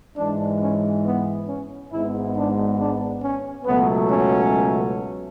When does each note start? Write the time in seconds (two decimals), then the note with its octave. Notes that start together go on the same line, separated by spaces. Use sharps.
0.17 G#2 E3 G#3 D4
0.60 C#4
1.04 B3
1.47 C#4
1.91 G#1 G#2 G#3 B3 E4
2.35 D4
2.78 D4
3.22 C#4
3.65 C#2 B2 F#3 A3 B3
4.09 C#4